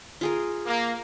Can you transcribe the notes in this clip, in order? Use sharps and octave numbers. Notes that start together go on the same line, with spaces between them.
F4 G#4 A#4
A#3